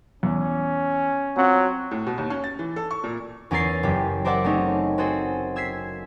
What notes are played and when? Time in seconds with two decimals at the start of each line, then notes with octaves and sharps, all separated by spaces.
0.23 E2 C#4
1.37 F#3 C4 F4 F#5
1.91 A2
2.07 B2
2.18 D#2
2.30 C#4
2.44 A6
2.59 E3
2.76 A4
2.91 C#6
3.04 A#2
3.51 E2 C#4 E4 A#4 A6 C7
3.83 F#1 G4
4.25 A#4 C5 D5 E5 F#5 A5
4.44 A3 C4 C#4 D#4
4.98 C4 F#4 G#4 A4 C5
5.56 E6 G#6 B6 C7 E7